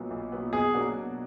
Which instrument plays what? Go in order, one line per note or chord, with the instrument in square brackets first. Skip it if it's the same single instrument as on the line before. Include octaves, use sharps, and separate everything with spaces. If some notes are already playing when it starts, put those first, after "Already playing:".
Already playing: [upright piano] B1 A#2 F#3 B3
B1
A#2 F#3 B3
[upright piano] B2 [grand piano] G#4
[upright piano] F#3 A#3 D4 F#4
B2